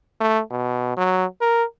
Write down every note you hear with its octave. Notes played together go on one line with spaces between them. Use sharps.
A3
B2
F#3
A#4